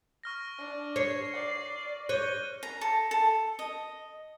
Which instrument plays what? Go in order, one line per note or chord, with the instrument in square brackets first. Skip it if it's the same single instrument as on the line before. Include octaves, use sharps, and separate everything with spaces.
[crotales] C#6 F6 A#6
[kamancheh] D4
[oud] C#5 [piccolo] C7
[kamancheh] D5
[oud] C#5 [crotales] F#6 G6 G7 [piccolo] D#7
[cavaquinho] A#5
A4
A4
D#5